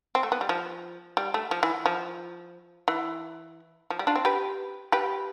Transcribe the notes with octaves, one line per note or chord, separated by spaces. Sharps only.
C4
A3
B3
G3
F3
G3
A3
F3
E3
F3
E3
F3
G3
D4 F4
C4
G4 B4
G4 B4